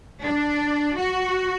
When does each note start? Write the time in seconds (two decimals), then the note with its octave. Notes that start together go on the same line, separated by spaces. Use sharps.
0.22 D4
0.97 F#4